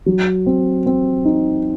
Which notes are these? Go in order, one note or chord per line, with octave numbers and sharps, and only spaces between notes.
F#3
C4
C4
D#4